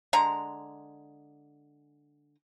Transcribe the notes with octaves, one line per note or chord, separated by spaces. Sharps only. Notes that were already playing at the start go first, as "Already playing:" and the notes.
D3 G#3 A#5